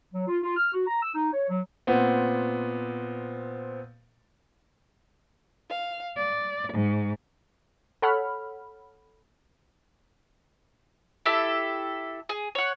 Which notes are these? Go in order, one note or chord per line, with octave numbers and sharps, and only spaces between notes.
F#3
F4
F4
F6
F#4
A#5
E6
D#4
C#5
F#3
A#2 B3 C4
F5
D5
G#2
A4 C#5 F#5 B5 F6
E4 G4 A4 E5
G#4
C#5 F#5